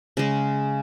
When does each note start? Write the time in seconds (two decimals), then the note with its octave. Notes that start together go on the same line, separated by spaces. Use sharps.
0.17 C#3 G#3